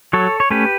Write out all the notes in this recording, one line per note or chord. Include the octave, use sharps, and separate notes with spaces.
F#3 A4 C#5
C#5
A3 C#4 G4 B4